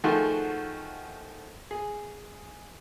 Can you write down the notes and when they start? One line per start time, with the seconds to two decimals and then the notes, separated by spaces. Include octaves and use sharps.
0.04 D#3 F3 A3 F#4 G#4 C5
1.71 G#4